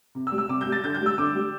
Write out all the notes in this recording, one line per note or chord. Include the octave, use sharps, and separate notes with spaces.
C3
E6
G3
E6
C3 D6
G6
G3
A6
D3 G6
G6
G3
E6
D3 D6
G3